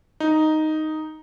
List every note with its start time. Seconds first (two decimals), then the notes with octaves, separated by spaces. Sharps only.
0.20 D#4